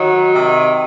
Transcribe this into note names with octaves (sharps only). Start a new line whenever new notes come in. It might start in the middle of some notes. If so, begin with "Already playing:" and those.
Already playing: D#3 F#3
C3